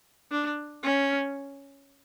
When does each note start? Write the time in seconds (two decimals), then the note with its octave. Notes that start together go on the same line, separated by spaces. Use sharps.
0.31 D4
0.84 C#4